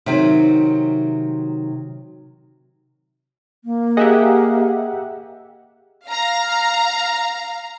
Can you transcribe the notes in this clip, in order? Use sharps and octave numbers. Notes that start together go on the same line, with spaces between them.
C3 D#3 F#3
A#3
G4 G#4 D#5 E5 F#5
F5 A#5